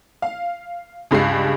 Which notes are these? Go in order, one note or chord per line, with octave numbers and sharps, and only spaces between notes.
F5
C#2 G2 G3 G#3 C7